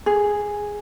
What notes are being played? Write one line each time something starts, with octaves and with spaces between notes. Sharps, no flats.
G#4